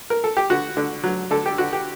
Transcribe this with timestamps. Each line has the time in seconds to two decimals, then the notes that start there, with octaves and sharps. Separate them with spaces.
0.10 A#4
0.24 A4
0.37 G4
0.50 D3 F#4
0.77 D3
1.04 F#3
1.31 D3 A4
1.46 G4
1.58 D3 F#4
1.73 G4